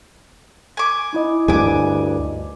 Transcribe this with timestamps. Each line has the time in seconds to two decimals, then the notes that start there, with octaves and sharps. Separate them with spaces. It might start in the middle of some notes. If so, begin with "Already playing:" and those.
0.77 G#5 D6
1.13 D#4 E4 D#5
1.48 D2 G2 G#5 D6